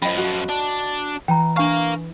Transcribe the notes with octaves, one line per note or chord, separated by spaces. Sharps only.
F#2 F3 D#5 G5 B5
F#4
D4
E3 G5 A#5
D4 A#4 F5 G#5 C#6